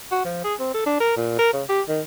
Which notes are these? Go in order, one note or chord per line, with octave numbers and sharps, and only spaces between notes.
F#4
F3
G#4
C4
A4
D4
A#4
A#2
A#4
C#3
G4
D#3